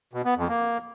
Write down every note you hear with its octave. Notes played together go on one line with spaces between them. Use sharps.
B2
B3
F2
A#3